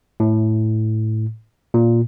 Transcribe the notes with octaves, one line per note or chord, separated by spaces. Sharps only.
A2
A#2